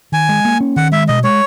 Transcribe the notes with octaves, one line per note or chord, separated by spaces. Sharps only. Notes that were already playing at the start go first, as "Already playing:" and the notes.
D#3 G#5
G#3
A#3
C#4
D#3 F#5
G#3 E5
B2 D#5
G#3 C#5